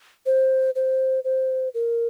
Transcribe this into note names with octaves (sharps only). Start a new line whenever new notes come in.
C5
C5
C5
A#4